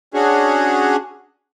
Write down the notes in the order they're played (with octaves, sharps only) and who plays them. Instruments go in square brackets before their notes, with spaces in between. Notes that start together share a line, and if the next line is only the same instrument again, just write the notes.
[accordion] C#4 D4 F#4 G#4